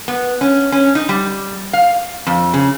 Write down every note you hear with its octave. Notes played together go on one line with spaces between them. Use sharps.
B3
C#4
C#4
D#4
G3
F5
F2
C#3